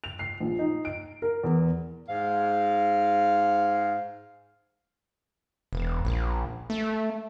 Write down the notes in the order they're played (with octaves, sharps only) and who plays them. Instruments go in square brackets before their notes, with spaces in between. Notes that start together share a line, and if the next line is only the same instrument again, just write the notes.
[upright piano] F7
C7
A#1
D#4
D7
A#4
E2
[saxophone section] G#2 F5
[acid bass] E1
A#1
A3